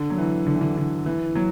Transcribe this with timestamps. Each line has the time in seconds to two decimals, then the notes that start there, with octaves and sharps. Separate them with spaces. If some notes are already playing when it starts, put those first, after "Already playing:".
Already playing: D3
0.10 F#3
0.18 E3
0.47 D3
0.55 E3
0.61 D3
0.77 D3
1.06 E3
1.35 F#3